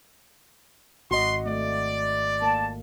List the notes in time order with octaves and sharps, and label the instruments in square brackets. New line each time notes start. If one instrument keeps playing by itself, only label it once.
[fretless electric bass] G#1 [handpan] F#4 D#5 [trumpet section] C6
[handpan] A3 [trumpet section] D5
[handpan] A#3 [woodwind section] A5